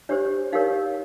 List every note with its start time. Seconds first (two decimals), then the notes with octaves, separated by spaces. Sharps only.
0.09 D4 G4 C5 C#5
0.53 D#4 G4 A#4 C#5 F5